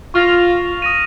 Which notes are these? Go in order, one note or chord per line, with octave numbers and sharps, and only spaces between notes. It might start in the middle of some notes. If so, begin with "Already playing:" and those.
F4 C#6 F6 A#6 F7
D#6 A#6 D#7